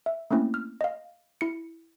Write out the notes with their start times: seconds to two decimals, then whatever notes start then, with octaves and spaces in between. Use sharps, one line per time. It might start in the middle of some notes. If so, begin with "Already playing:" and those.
0.06 E5
0.31 A3 A#3 C4 C#4 E4
0.54 F6
0.81 D#5 F5
1.41 E4 C#7